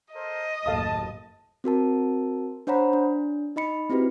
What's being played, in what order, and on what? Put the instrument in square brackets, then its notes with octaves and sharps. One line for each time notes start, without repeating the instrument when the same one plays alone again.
[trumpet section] A4 A#4 C5 [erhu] D#5
[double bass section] F#1 D#2 A2 [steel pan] A4 F5 D#6 [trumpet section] A5
[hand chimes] C4 F#4 A#4 A5
D4 C5 C#5 F#5 A#5 B5
D4
D#4 D#5 B5 C#7
C4 E4 F#4 G4 B4